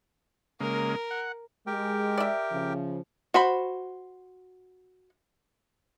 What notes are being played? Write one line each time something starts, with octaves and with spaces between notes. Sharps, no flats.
C#3 G#3 A#3 A#4
F#5
G#3 G4 A#4 G5
D5 E5
C#3 F3
F#4 C5 B5